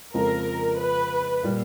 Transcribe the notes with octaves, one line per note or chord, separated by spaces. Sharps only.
F2 C#3 F3 G#3 C4 A#4
B4
A#2 G3 A#3